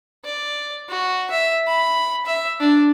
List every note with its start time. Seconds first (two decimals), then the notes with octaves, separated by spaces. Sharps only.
0.25 D5
0.89 F#4
1.31 E5
1.67 B5
2.26 E5
2.60 D4